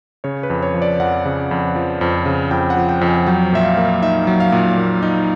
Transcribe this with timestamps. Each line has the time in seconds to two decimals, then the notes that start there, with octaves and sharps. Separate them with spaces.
0.24 C#3 C#5
0.43 B4
0.50 F2
0.62 C#5
0.74 F3
0.82 D5
1.00 F2 F#5
1.25 C#3
1.51 F2
1.76 F3
2.01 F2
2.26 C#3
2.51 F2 G5
2.70 F#5
2.77 F3
2.89 G5
3.01 F2
3.08 G#5
3.27 F#3 G5
3.53 A#2 E5
3.65 F5
3.77 A#3
4.02 D#4 E5
4.27 F#3
4.40 F5
4.52 A#2
4.78 A#3
5.02 D#4